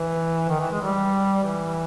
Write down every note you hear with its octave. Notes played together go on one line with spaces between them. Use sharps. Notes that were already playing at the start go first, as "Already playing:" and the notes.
Already playing: E3
D#3
E3
G#3
G3
E3